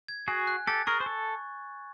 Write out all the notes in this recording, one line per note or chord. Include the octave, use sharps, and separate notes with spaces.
G#6
F#4 G#4 G#5
F#6
G4 A4 A6
G#4 A#4 C#6
C5
A4